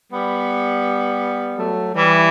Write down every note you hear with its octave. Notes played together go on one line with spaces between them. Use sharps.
G3 B3
F#3 A3
E3 G3